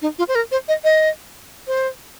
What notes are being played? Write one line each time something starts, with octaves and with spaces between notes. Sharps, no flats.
D#4
F4
C5
A#4
C5
D#5
D#5
C5